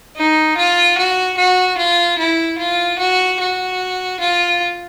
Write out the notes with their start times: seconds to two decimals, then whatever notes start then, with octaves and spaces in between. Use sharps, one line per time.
0.16 D#4
0.57 F4
0.98 F#4
1.37 F#4
1.77 F4
2.19 E4
2.58 F4
2.99 F#4
3.40 F#4
4.20 F4